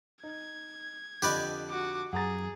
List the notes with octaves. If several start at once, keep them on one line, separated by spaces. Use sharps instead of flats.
D#4 G#6
F2 D3 G4 B4 D5 D#5
F#4 D6
F#2 G#4 F#5 A#5 A6